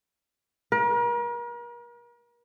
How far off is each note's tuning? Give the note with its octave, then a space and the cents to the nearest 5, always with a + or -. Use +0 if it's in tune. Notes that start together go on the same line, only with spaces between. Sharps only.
A#4 +40